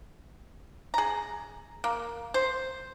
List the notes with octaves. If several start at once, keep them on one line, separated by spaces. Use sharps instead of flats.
G#4 A#5
A#3
C5